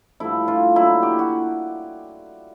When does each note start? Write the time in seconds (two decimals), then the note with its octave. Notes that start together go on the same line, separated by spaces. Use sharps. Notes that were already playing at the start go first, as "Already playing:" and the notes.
0.20 G2 D3 F3 A3 E4
0.48 F4
0.76 D3 F#3 A#3 E4
1.02 G4
1.19 F#4